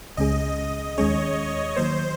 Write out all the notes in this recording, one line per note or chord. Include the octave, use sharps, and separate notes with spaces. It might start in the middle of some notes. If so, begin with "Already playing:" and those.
C#2 C#3 G#3 C#4 G#4 D#5
D#2 D#3 G#3 C#4 G#4 C#5
D#3 F#3 A#3 C5